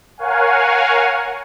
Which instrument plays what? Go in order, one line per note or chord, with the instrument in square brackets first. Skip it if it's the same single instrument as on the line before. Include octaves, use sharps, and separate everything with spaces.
[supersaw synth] A#4 C#5 F5 F#5 G#5